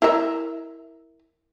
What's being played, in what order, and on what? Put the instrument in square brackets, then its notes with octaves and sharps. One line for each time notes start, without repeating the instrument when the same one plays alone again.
[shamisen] E4 A#4 E5